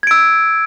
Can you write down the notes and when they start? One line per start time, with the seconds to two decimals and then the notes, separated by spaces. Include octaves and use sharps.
0.03 G#6
0.07 D7
0.11 E6